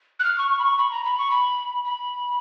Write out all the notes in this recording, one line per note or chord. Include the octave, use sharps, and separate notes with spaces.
F#6
F6
C#6
C#6
B5
C#6
B5
A#5
B5
C#6
B5
B5